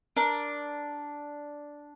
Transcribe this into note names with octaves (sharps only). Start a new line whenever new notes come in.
D4 A#4